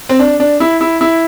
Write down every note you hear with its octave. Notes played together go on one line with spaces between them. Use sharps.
C4
D4
D4
E4
E4
E4